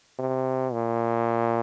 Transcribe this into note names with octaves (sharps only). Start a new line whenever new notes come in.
C3
A#2